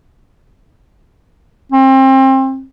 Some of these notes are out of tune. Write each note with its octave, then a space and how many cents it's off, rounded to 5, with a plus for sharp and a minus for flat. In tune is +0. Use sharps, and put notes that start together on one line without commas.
C4 +30